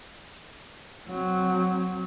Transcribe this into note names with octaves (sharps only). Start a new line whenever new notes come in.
F#3 C4